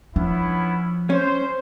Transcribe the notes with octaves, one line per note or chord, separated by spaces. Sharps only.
F3 B3 C#4 D4 E4
C#4 C5